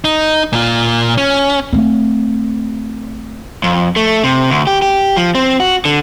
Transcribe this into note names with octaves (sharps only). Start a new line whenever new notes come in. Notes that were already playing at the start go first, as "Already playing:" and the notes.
D#4
A#2 F4
C#4
A3 C4
F2
A3
C3
D2
G4
G4
F3
C4
F#4
D3